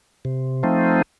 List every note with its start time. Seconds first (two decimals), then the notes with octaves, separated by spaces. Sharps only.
0.25 C3
0.63 F3 A3 C4 D#4